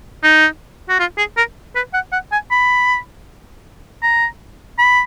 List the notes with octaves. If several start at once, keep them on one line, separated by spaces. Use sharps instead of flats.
D#4
F#4
F4
G#4
A#4
B4
F#5
F#5
G#5
B5
A#5
B5